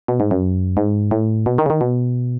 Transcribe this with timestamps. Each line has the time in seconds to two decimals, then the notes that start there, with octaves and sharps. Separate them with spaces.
0.08 B2
0.20 G#2
0.31 F#2
0.77 G#2
1.11 A2
1.46 B2
1.58 D#3
1.66 C#3
1.70 D#3
1.81 B2